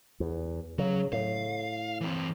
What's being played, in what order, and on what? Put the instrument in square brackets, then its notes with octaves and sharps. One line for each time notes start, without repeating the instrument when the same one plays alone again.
[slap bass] E2
[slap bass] C#3 [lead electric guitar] F#3
[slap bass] A2 [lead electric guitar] F5
[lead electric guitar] E3 C4